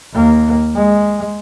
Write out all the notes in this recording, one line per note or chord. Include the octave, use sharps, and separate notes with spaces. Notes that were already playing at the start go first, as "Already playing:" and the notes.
D#2 A#3
G#3